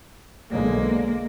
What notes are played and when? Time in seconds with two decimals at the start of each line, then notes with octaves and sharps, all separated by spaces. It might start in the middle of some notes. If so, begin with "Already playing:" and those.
0.51 B1 D3 G#3 A#3